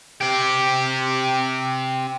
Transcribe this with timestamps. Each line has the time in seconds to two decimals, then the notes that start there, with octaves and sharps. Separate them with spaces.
0.21 C4 G4